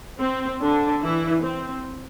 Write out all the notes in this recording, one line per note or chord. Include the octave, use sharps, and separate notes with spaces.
C4
D3 D4
E3 E4
C4